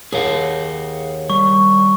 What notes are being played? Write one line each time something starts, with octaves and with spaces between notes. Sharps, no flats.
D#2 G#4 F5 F#5
G3 C#6